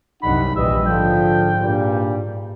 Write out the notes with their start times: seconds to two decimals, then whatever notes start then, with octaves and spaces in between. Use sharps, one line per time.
0.23 C2 F#2 D4 D#4 F#5 B5
0.56 A#1 D#2 E3 G3 D#5 E5
0.87 G#2 D3 F3 G5
1.61 G2 A#2 G3